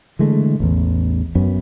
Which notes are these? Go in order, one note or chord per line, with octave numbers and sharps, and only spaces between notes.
D3 E3 G#3 A3
A1 E2
F#2 B3 C#4